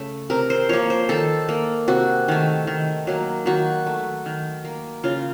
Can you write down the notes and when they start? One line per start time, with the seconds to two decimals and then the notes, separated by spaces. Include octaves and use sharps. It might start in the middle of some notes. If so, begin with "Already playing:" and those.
Already playing: C#3 A3
0.30 C3 A#4
0.50 C5
0.69 F3 A#3 C#5
0.90 C5
1.09 D#3 A4
1.49 A#3
1.88 C3 F#4
2.28 D#3 A3
2.67 D#3
3.07 F#3 A#3
3.46 D#3 F#4
3.86 A3
4.26 D#3
4.65 A#3
5.04 C#3 F4